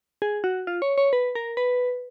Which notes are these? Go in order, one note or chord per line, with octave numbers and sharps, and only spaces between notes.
G#4
F#4
F4
C#5
C#5
B4
A#4
B4